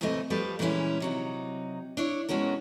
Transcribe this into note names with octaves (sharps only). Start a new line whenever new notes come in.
D#2 G#2 C3 E3 A3 D#5
F3 G3 A3 G4 B4
A#2 E3 G3 G#3 C#4 E4
C3 F#3 D#4
D4 E4 C#5
B2 G#3 C#4 F#4 A#4